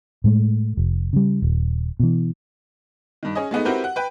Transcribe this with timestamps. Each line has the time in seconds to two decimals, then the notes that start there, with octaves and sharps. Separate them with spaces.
0.24 A2 G#3 A3
0.77 F1
1.13 C#3 G3
1.42 D#1
2.00 B2 E3
3.23 G2 D#3
3.35 C#4 G#4 D#5
3.51 G#3 A3 B3 D#4
3.65 C4 E4 F#4 G4 A#4 B4
3.84 F#5
3.96 B4 G5